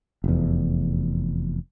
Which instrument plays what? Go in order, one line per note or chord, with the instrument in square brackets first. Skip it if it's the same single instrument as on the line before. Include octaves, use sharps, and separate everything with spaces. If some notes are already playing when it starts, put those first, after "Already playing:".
[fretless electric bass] F1 E2